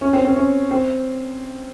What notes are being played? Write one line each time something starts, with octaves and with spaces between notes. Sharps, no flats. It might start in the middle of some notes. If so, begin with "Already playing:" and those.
C#4
C4
C4
C#4
C4